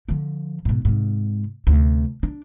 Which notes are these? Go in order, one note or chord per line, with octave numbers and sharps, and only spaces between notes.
D3 F3
G#2 B2
G#2 C3
D2 C3
D4